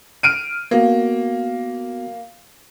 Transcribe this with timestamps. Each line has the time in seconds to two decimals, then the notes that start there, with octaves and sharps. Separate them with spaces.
0.23 F6 D7 D#7
0.71 A#3 B3 F#4